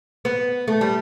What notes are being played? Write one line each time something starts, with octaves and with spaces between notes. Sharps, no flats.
B3
A3
G3